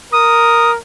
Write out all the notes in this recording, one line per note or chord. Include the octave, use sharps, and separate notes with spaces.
A#4 D#6